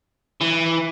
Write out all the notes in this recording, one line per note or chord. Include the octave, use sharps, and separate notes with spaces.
E3